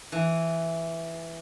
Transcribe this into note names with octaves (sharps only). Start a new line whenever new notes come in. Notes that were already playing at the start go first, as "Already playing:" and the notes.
E3